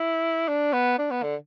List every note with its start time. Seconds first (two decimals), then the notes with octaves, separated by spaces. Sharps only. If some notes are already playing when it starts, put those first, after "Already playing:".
Already playing: E4
0.48 D4
0.73 B3
0.99 D4
1.11 B3
1.23 D3